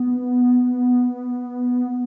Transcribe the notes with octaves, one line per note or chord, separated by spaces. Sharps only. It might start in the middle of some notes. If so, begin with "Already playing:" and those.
Already playing: B3